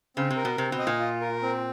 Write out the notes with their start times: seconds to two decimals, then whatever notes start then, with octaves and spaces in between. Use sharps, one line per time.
0.17 C#3 C4
0.30 C3
0.37 A#4
0.45 B2
0.58 C3 C4
0.72 B2
0.79 D#5
0.87 A#2
1.00 F4
1.21 A#4
1.42 C4